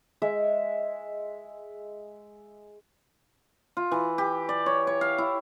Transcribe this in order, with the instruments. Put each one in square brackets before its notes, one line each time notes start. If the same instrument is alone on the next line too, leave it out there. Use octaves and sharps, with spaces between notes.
[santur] G#3 E5
[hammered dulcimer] F4
E3
G4
D5
C#5
C#5
F5
E4